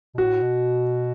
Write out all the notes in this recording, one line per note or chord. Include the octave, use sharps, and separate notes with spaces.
B2
A2 F#4
B2